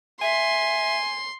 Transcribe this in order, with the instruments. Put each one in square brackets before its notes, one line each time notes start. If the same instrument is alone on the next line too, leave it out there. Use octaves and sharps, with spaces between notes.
[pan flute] E5 [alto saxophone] G#5 [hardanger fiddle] C6